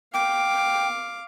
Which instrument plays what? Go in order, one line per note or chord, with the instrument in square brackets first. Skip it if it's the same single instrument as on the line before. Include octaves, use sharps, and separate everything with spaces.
[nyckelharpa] F5 D6 [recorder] G5